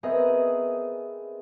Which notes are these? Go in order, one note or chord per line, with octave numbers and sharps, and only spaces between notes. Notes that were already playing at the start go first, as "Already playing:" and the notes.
B3 C4 G#4 A#4 D#5 E5